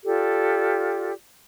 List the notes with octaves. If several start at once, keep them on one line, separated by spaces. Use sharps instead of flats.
F4 G4 A4 D5